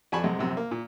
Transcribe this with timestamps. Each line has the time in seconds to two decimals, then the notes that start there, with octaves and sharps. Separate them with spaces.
0.12 F2 D5 G#5 A5 B5 C#6
0.24 F#2 C3 G#3
0.39 A#1 F#2 C3
0.57 A#3
0.71 A#2